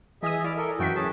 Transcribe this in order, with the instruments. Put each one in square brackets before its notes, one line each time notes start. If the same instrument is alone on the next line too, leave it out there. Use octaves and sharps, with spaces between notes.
[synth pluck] E3 D#6 [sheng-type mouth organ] G#4 D#5 E5
[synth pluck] E4 [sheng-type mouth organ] D5 F6
[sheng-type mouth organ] A4 A#4
[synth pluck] F#2 E3 B6 [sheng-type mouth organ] F#4 G5
[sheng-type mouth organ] C#4 G#4 A5